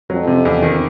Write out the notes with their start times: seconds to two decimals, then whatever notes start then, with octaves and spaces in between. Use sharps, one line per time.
0.10 F2 F#3
0.27 C3
0.45 E2
0.63 D#3